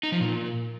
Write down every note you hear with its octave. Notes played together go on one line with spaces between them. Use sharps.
D#4
F3
A#2